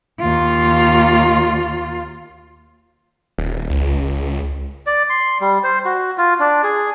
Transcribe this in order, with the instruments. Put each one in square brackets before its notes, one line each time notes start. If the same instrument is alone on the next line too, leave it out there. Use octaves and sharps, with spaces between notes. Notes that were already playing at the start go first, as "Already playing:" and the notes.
[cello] D#2 F4
[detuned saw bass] D#1
C#2
[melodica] D5
C6
G3
C5
F#4
F4
D4
G#4